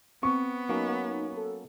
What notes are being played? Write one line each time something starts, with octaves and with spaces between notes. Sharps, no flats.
B3 C4 C#6
F#3 A#3 C#4 D#4
A4